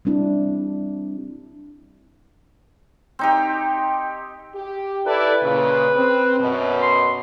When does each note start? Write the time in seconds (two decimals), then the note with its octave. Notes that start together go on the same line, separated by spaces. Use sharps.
0.05 G3 C4 D4 E4
3.19 C4 D#4 G4
4.55 G4
5.06 E4 A4 B4 D5
5.43 A#2 C#3
5.97 C4
6.40 F#2 B2
6.82 C6